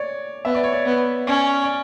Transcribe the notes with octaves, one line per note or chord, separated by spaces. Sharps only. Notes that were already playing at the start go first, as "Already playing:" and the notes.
Already playing: C#5 D5
B3 E5
D5
C#5
D5
B3
C#4 D5
D5